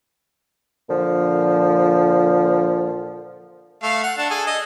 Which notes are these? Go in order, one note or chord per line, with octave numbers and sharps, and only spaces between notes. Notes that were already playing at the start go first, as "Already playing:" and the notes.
A#2 D3 F3
A3 F5
F#5
D4 A5
G#4 A4
D#5